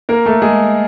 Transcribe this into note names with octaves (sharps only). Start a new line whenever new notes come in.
A#3 A#4
A3 A4
G#3 G#4